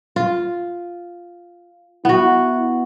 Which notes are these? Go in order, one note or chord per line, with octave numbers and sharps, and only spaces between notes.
F4
B3 E4 F#4